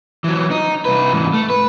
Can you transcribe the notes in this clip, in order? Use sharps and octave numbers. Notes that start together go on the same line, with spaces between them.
E3 F#3
D#4
C2 B4
G#2 E3
A3
B4